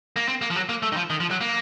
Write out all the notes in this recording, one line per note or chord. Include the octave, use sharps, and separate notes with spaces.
A#3
C4
A#3
F3
F#3
A#3
A3
D#3
F3
D#3
F3
F#3
A#3